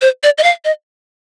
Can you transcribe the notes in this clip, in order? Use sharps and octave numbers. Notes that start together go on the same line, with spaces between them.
C5
D5
D#5
F5
D#5